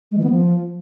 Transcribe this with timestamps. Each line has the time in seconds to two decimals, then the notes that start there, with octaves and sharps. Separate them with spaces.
0.11 G#3
0.18 E3
0.24 B3
0.30 F3